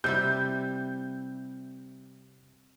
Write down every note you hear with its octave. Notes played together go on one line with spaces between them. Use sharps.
C3 G3 E4 G6